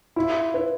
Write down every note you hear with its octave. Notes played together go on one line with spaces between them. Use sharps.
E4 F4
B4